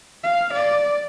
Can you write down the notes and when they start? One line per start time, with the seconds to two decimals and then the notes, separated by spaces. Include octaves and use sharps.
0.24 F5
0.53 D5